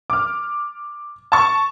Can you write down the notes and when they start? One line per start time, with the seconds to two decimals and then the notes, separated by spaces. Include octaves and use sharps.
0.10 D6 F6
1.32 A5 C#6